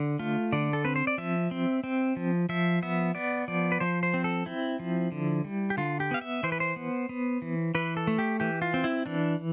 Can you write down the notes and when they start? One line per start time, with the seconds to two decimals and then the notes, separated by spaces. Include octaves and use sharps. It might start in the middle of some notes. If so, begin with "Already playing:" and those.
Already playing: D3
0.19 A3 F4
0.52 D3 D5
0.73 A4
0.85 C4 B4
0.96 C5
1.07 D5
1.18 F3 E5
1.51 C4
1.84 C4
2.16 F3
2.49 F3 E5
2.82 B3 E5
3.15 B3 D5
3.48 F3 D5
3.72 B4
3.80 F3 C5
4.03 C5
4.14 C4
4.24 A4
4.46 C4 E4
4.79 F3
5.12 D3
5.44 G3
5.70 G4
5.77 D3 F4
6.00 G4
6.11 B3 F5
6.21 E5
6.43 E3 C5
6.52 B4
6.60 C5
6.76 B3
7.09 B3
7.42 E3
7.75 E3 B4
7.97 A4
8.07 A3
8.18 G4
8.40 E3 G4
8.62 F4
8.74 C4
8.84 E4
9.06 E3 D4